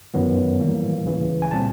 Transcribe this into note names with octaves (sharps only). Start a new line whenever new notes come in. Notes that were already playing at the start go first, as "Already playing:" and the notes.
F#2 D#3 F#3 B3
A2 E3 G3 A#3
C#2 C#3 E3
G#5
A#2 G3 C4 A5